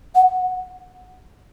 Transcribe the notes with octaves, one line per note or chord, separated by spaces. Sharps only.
F#5